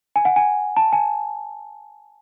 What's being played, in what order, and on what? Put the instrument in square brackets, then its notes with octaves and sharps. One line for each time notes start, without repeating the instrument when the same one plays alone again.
[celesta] G#5
F#5
G#5
A5
G#5